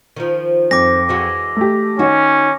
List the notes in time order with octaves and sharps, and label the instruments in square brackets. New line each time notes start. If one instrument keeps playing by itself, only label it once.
[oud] D#3 F3
[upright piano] F2 [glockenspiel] D6 A#6
[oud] E3 G#3 F#4
[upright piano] A3 G4
[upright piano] D#3 C#5 [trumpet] C#4 [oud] F#4